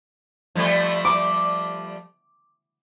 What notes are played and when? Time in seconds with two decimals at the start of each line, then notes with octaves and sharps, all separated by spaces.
0.55 F3 G3 A3
1.05 D6